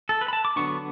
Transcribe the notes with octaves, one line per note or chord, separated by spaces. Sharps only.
A4
B4
B5
A5
D6
D3 F#3 B3 D4 C#6